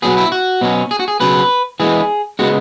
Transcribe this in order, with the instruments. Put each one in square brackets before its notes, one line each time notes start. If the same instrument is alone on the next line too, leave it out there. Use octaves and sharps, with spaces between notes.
[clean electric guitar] B2 F#3 B3 G#4
E4
F#4
B2 F#3 C#4
G#4
F#4
G#4
C#3 F#3 B3 B4
E3 G#3 B3 G#4
C#3 G#3 B3 F#4